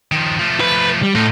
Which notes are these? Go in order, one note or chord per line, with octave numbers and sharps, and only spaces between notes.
D#3 F3
F3 A3
B4
G3
A2 D#4 F4